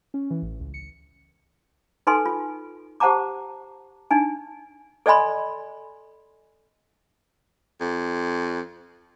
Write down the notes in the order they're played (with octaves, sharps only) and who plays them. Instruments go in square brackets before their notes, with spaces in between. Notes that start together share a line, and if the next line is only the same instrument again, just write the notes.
[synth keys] C#4
E3
A1
C#2
C#7
[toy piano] D#4 A4 B4 G#5 C6
F4
G4 C5 F#5 A5 A#5 D6
D4 D#4 G#5
A4 D5 D#5 G#5 B5 C6
[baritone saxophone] F2